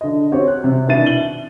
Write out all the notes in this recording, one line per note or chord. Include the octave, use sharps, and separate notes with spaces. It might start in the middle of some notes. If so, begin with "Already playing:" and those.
D3 D#5
C4 F#4 G4 C#5
F#6
C3
B2 D#3 D4 E4 A6 D#7
F#7 G7